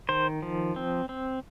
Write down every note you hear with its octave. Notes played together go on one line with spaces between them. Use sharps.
D#3 C5
F3
C4
C4